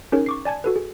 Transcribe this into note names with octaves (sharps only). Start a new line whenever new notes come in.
C#4 D#4 G#4 A#4 C#5
C#6 D6 C7
D5 G#5 A5 G#6
F#4 A4 B4
G#4